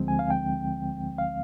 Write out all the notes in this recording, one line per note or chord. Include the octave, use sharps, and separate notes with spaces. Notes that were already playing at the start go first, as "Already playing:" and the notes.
Already playing: D2 D3 F3 G#3 C4
G#5
F5
G5
F5